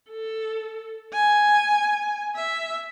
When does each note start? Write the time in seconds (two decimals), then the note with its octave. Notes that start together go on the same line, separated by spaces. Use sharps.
0.10 A4
1.13 G#5
2.35 E5